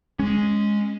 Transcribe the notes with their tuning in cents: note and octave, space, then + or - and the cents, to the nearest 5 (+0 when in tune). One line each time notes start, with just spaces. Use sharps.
G#3 +0 C#4 +5